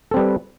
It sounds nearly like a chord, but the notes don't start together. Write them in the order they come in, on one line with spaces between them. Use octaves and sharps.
A4 C4 G3 B4